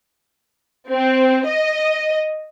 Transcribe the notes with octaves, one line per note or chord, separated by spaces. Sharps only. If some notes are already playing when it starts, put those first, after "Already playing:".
C4
D#5